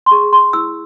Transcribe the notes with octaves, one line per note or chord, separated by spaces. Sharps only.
C6
G#4 C#6
C6
E4 E6